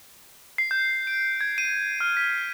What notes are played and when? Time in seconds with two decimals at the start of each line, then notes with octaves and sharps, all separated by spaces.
0.58 C7
0.71 G6
1.07 D7
1.41 G#6
1.58 D#7
2.01 F6
2.17 B6